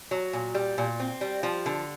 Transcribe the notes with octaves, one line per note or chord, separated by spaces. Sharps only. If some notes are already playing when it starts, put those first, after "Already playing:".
F#3
A#2
G3
A#2
C4
G3
F3
D3